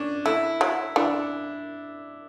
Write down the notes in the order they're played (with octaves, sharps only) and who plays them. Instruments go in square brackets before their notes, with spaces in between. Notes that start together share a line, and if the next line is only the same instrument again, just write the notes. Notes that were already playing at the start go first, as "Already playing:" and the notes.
Already playing: [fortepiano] C#4 D4
[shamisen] A3 [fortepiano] E4
[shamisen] F#3
[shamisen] E3 [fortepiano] D4